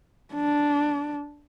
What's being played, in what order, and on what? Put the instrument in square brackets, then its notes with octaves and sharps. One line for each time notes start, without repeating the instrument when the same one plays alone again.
[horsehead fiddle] D4